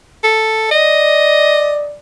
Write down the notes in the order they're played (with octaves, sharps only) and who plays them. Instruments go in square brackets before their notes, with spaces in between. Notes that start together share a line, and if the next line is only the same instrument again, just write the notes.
[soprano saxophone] A4
[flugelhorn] D5 [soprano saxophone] D#5